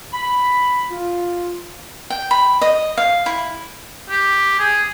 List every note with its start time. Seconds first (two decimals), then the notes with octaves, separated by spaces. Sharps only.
0.13 B5
0.90 F4
2.10 G5
2.31 B5
2.61 D#5
2.97 F5
3.26 E4
4.09 G4
4.59 G#4